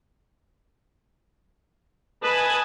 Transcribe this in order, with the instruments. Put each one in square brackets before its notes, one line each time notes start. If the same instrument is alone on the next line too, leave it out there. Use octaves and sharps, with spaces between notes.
[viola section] B4 [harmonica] D#5 A5 [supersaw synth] G#5 D#6 G#6